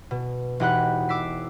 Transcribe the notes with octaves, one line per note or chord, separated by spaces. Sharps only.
B2
E1 D#4 G4 F#5 B5 F#6
D6 E6 B6 C7